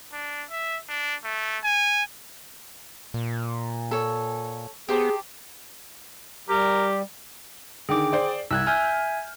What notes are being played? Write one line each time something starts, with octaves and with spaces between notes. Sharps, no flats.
D4
E5
D4
A3
G#5
A#2
A4 C#5
B3 G4 G#4 C5 A5
G3 G4 A#4
D3 D#3 G#4 G5 D6
C5 D5
C2 E6 F#6 G#6
E5 G#5 F6 G6 G#6